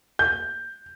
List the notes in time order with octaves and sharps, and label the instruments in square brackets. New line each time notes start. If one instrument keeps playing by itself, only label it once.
[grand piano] G6